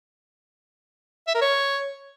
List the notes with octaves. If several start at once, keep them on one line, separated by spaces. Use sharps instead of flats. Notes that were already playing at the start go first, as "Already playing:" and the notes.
E5
A#4
C#5